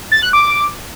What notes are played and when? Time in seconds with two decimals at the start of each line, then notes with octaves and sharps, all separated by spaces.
0.12 A6
0.22 F#6
0.33 D6